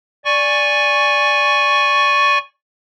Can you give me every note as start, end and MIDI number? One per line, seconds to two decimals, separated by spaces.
0.25 2.38 74
0.25 2.38 80
0.25 2.38 85